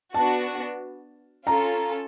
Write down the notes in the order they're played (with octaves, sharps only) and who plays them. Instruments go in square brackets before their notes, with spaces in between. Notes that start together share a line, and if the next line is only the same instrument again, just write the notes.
[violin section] B3 D4 F#4 [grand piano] A5
[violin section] C#4 F4 A4 [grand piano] A#5